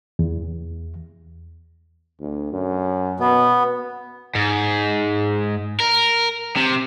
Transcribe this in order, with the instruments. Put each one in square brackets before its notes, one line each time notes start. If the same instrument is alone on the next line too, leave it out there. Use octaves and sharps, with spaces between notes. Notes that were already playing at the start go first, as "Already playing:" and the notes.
[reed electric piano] E2
[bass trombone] D2
F#2
[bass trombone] B2 [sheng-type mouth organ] B3
[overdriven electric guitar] G#2
A#4
C3